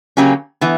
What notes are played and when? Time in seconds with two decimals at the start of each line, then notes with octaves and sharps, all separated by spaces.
0.17 C#3 F#3 A#3 C#4 G4
0.61 E3 B3